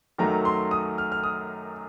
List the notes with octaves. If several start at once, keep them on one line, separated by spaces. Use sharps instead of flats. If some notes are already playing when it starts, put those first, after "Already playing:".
F#2 D#3 F#3 A3 A#5
C6
D#6
F6
F6
D#6